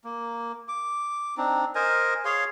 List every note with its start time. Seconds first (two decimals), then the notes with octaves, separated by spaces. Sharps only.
0.04 A#3
0.68 D6
1.37 C4 D4 D#4
1.75 A#4 C5 D#5 G#5
2.25 G#4 C#5 F5 C6